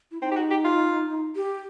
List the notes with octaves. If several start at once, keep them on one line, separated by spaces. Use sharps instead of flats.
E4
C4 D#4
G4
F#4
G4
F4
G4